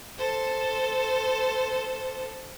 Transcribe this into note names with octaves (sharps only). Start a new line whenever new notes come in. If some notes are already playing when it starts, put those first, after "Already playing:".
A4 C5